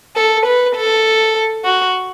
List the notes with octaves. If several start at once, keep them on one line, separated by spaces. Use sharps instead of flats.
A4
B4
A4
F#4